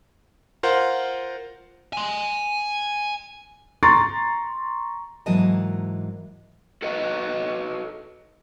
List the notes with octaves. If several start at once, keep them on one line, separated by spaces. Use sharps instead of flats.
F4 A#4 C5 F5 F#5
G#5 C6
A#5 C6 C#6 A6
G#2 E3 F#3 A#3 D#5 A5
F#4 A4 B4 D#5